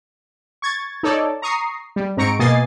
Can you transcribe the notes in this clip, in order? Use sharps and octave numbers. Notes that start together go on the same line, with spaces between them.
C#6 G#6 A6
D#4 A4 C#5 D5
A#5 C#6 D#6 C7
G3
G#2 C4 A#5 C#6 C#7 D7
B2 A#3 D#5 G#5 A6 C7